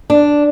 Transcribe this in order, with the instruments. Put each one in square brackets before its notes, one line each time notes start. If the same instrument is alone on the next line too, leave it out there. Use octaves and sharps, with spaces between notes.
[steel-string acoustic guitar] D4